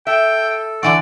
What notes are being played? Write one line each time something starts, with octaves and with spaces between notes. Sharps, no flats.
A4 E5 G5
D3 E3 F#4 D5